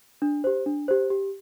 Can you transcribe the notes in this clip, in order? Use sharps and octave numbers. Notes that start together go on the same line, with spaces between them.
D4
G4 C5
D4
G4 C5
G4